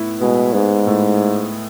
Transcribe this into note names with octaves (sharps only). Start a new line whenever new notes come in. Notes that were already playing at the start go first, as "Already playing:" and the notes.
Already playing: A2 B3 E4
B2 G#3
G#2 B3
A2